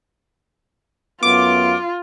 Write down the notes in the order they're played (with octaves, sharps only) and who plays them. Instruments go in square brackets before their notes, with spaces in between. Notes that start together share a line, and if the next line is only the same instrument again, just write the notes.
[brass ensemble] F#2 A3 B3 [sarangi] F4 [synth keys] D6